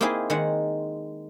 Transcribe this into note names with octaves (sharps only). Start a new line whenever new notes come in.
A#3 C4 D#4 E4 G#4 C5
D#3 G#3 F#5